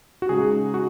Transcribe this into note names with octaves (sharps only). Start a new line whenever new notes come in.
F#4
C#3 G#3 D#4 G#4
F#4